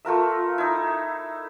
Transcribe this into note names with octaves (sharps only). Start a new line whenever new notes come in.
A3 F4 A#4 E5
D#4 E4